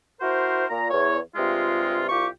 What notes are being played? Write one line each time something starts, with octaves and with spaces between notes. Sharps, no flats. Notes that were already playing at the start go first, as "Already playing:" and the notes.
E4 F#4 A#4 C5
A#2 A#5
E2 C#5
G2 C3 G#3 F4
C2 F4 G4 C#6 D6